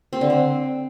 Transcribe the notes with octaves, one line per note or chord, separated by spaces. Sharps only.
C4
D3
C4